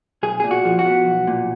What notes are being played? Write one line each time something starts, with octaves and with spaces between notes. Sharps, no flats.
B1 G#4
A#2 G#4
F#4
F3
F#4
B3
B1
A#2